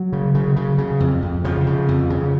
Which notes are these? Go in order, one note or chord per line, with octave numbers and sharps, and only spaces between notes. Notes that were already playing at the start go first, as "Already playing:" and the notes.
Already playing: F#3
C#3
C#3
C#3
C#3
F2
F2
C#3 F3
C#3
F2
C#3